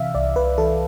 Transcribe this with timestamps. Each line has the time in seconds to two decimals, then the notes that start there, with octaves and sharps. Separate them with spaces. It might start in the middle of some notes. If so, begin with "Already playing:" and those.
Already playing: C3 E3 E5 F5
0.15 C2 D5
0.36 C2 B4
0.58 E3 A4